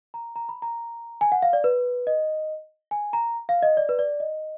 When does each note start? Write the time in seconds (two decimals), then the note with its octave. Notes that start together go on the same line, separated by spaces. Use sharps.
0.14 A#5
0.36 A#5
0.49 B5
0.62 A#5
1.21 G#5
1.32 F#5
1.42 F5
1.53 D5
1.64 B4
2.07 D#5
2.91 G#5
3.13 A#5
3.49 F5
3.62 D#5
3.77 D5
3.89 B4
3.99 D5
4.20 D#5